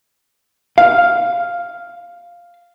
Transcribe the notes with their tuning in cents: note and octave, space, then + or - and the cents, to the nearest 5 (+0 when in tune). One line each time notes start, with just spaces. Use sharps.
F5 +0